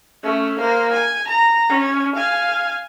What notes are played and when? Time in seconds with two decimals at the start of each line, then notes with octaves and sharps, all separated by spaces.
0.23 A3 C#4
0.60 A#3 C5
0.94 G#5
1.29 A#5
1.69 C#4
2.17 F5 G#5